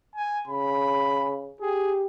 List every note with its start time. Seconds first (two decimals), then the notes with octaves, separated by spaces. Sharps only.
0.16 G#5
0.48 C#3 B5
1.61 G4 G#4